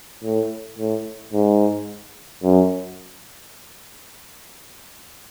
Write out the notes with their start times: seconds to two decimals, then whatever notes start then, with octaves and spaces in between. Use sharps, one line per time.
0.24 A2
0.79 A2
1.33 G#2
2.44 F#2